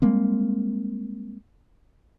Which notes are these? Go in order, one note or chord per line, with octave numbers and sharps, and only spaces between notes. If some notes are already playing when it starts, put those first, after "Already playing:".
G3 G#3 A#3 C4